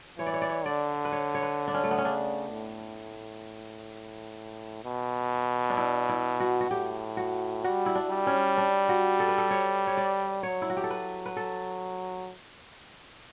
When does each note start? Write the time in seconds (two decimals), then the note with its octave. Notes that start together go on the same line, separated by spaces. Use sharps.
0.19 E3 C#5
0.26 D5
0.34 C#5
0.42 D5
0.49 C#5
0.65 D3 D5
1.05 B4
1.12 C#5
1.35 C#5
1.42 B4
1.68 D4
1.74 C#4
1.84 A3
1.91 B3
1.98 C#4
2.05 C#3 D4
2.52 A2
4.84 B2
5.70 D4
5.77 E4
6.09 E4
6.40 F#4
6.61 F#4
6.71 A2 G4
7.17 F#4
7.64 G3 F#4
7.86 E4
7.95 D4
8.10 G3
8.27 C#4
8.58 D4
8.89 F#4
9.20 A4
9.28 B4
9.38 A4
9.51 C#5
9.87 C#5
9.97 D5
10.43 F#3 C#5
10.62 E4
10.70 F#4
10.77 G4
10.84 A4
10.90 B4
11.26 B4
11.37 A4